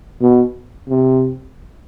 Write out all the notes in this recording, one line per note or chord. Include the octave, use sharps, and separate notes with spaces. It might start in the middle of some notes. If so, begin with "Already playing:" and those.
B2
C3